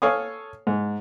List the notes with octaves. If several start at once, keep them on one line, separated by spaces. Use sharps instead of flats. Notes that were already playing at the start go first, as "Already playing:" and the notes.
A4 C#5 F5 G#5 D#6
G#2